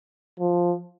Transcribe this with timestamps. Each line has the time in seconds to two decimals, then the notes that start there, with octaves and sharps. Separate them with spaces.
0.39 F3